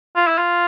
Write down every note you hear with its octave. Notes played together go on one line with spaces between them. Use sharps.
F4
E4
F4